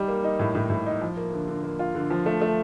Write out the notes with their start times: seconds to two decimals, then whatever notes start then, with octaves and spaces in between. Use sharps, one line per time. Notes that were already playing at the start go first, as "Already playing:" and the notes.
Already playing: G3 D#4
0.08 A#3
0.24 D#4
0.39 A2
0.55 A2
0.70 A2
0.86 D#4
1.01 F3
1.17 A#3
1.32 D3
1.47 D3
1.63 A#3
1.79 F4
1.95 D3
2.10 F3
2.26 A3
2.41 A3